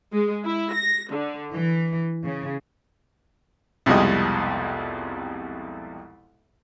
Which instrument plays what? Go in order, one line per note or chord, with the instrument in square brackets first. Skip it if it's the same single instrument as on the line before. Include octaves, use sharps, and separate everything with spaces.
[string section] G#3
E4
A#6
D3
E3
C#3
[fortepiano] C2 F2 B2 G3 G#3 D#5